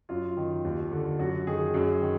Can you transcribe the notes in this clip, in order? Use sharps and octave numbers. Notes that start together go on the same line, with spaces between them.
F#2 F4
D#3
D#2
D3
F#2 F#4
D#3 G#4
F#2 G#4
D#3